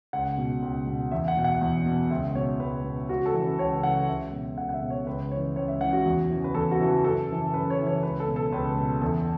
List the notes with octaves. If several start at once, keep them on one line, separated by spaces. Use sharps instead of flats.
C#2 F#5
B2
C#2
B2
E2 E5
F#5
B2
F#5
E2
B2
C#2 E5
B2 C#5
C#2 B4
B2
C#2 F#4
A4
C#3 E3
B4
C#2 C#5
C#3 E3 F#5
C#2 E5
B2
C#2 F#5
F#5
E5
B2
C#5
C#2 B4
C#3 E3 C#5
C#2 C#5
E5
C#3 E3 F#5
F#4
E2
C#3 E3
B4
E2 A4
F#4
C#3 E3
F#4
F#2 A4
C#3 E3
F#2 B4
C#5
C#3 E3
C#5
C#2 B4
A4
B2
A4
C#2 B4
B2
E2 A4